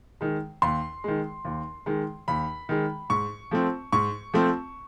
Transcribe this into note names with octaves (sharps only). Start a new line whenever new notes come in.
D#3 G#3
D#2 C6
D#3 G#3
D#2
D#3 G#3
D#2 B5
D#3 G#3
G#2 C#6
F3 A3 C4
G#2 C#6
F3 A3 C4